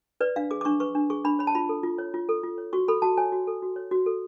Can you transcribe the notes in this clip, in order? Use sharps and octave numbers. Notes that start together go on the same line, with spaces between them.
B4 D5
D4 F5
G#4 D6
D6
D4 C#6
B4 C#6
D4
G#4 C#6
D4 B5
C#5 B5
A5
F4 B5
A4
F4
C#5
F4
A4
F4
C#5
F#4 C#6
A4 B5
F#4 A5
C#5 G#5
F#4
A4
F#4
C#5
F#4
A4